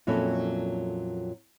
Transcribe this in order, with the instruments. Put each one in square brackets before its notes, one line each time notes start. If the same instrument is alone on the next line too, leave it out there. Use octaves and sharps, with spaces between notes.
[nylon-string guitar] F2 A#2 F#3 C#4 E4 A4